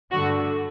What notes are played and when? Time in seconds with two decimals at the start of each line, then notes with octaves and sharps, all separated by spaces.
0.11 G2 D3 A3 F#4